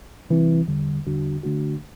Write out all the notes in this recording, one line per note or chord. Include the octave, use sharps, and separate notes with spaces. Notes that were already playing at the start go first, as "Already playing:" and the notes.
C3 E3 G3 C4 E4
E2 D3 G3
E2 D3 G3 D4 F#4
D3 A3 D4 F#4